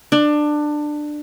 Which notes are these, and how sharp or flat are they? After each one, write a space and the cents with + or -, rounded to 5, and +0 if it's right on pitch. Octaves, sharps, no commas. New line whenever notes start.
D4 +20